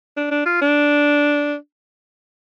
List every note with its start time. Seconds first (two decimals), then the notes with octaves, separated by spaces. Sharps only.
0.17 D4
0.31 D4
0.46 F4
0.62 D4